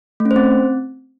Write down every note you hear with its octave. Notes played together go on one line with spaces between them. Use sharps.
A3
C#4
C5
C4